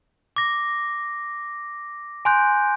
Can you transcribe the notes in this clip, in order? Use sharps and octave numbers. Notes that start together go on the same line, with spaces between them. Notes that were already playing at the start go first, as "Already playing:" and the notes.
D6 A#6
G#5 C6 F#6 G6